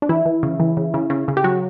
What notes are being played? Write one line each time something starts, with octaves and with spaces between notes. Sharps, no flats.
D4
E3 E4
E3
C#3
E3
C#3
C#3
C#3
C#3
G4
F#3 F#4